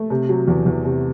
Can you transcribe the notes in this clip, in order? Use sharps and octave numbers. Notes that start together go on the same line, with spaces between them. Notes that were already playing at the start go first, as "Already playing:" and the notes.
Already playing: A3
C3
F#3
E2
E2
C3